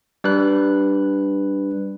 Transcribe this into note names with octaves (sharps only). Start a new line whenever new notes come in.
G3 D4 B4 F#6